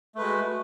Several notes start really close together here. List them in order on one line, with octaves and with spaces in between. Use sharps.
A3 B4 G#3 F#4